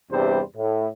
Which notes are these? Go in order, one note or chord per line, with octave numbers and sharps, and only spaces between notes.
E2 G2 C3 G3 C5
A2